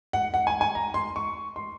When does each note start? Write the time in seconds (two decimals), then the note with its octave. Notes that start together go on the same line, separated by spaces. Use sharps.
0.13 F#5
0.34 F#5
0.47 G#5
0.61 G#5
0.75 A#5
0.94 C6
1.16 C#6
1.56 C6